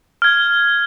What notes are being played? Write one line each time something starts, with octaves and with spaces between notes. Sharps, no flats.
F6 G#6